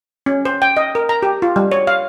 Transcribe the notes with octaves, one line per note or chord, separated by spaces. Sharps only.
C#4
C5
G5
D#5
A#4
A#5
G4
F4
G3
C#5
F5